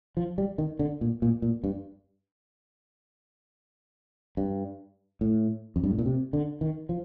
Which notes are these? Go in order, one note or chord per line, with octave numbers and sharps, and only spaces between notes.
F3
G3
D#3
D3
A#2
A#2
A#2
G2
G2
A2
F2
G2
A2
A#2
C3
D3
D#3
F3